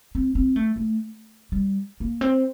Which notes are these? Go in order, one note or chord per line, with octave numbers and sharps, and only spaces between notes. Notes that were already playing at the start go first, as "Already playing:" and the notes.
C4
C4
A3
A3
G3
A#3
C4